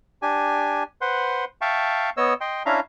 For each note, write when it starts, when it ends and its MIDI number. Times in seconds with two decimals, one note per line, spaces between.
0.22 0.83 62
0.22 0.83 67
0.22 0.83 80
1.01 1.45 71
1.01 1.45 72
1.01 1.45 78
1.01 1.45 84
1.61 2.10 76
1.61 2.10 77
1.61 2.10 79
1.61 2.10 81
1.61 2.10 85
2.17 2.34 59
2.17 2.34 73
2.17 2.34 75
2.17 2.34 88
2.41 2.63 75
2.41 2.63 79
2.41 2.63 84
2.66 2.80 61
2.66 2.80 62
2.66 2.80 64
2.66 2.80 76
2.66 2.80 77
2.66 2.80 82